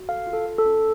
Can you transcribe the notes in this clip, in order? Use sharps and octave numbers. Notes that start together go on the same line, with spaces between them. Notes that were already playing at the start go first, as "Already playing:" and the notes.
Already playing: F#4
A4 F5
F4
A4
A4
A4
C#4